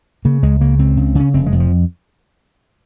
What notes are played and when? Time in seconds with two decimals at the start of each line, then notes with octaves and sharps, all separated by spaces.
0.25 C#3 A#3
0.43 C#2 G#3
0.61 C#3 A#3
0.79 C#2 C4
0.97 C#3
1.15 C#3 C#4
1.34 F1 C4
1.46 G#3
1.52 F2
1.60 F3